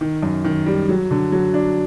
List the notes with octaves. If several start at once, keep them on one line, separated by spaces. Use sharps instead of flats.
D#3
F#2
D#3
G3
F#3
D3
F#3
D4